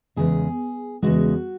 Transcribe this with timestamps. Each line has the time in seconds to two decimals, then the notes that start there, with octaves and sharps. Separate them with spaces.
0.16 E2 C#3 G#3 G#4
1.02 E2 C#3 G#3 F#4